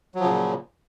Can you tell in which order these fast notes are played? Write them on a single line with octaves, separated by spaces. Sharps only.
F#3 F3 C#3 A#2